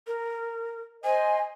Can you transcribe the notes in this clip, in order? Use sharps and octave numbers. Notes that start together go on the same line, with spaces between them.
A#4
C5 D#5 G#5